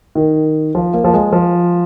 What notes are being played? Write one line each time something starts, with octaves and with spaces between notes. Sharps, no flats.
D#3
F3
A#3
F3
G#3
F3